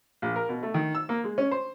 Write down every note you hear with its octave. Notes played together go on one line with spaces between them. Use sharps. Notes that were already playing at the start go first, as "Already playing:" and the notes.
A#1
A#4
B2
A3
D#3
E6
A#3
G#3
C#4
C5